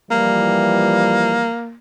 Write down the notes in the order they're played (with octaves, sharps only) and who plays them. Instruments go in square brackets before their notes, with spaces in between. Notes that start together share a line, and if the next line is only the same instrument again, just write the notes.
[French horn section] E3 F3 G3 [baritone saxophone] A#3